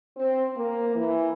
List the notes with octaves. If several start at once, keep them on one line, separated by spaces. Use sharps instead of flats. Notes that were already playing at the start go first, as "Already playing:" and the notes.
C4
A#3
E3